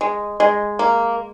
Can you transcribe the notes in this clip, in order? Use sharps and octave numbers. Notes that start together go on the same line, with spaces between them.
G#3
G#3
A#3